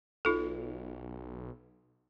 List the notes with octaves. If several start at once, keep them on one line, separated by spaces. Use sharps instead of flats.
B1 D#4 F4 A4